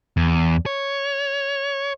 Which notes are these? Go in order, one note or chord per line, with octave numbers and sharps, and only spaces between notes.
E2
C#5